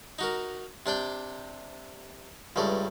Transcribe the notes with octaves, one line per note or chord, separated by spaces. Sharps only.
D#4 F#4 A#4
C3 D4 D5 G5
C#2 G2 A3 D5